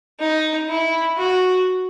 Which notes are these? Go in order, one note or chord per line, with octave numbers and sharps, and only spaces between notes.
D#4
E4
F#4